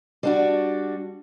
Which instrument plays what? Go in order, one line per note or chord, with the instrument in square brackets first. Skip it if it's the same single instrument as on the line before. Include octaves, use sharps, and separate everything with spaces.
[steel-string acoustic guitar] G3 D4 F#4